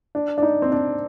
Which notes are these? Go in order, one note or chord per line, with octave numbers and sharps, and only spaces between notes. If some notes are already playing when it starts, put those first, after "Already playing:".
D4
D4
D#4
C4
D4